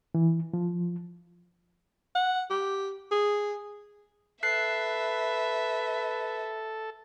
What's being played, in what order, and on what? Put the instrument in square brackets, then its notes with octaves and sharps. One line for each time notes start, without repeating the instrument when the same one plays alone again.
[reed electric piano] E3
F3
[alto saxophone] F#5
G4
G#4
[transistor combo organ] A4 [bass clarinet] B4 [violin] E5 [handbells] F#6 C7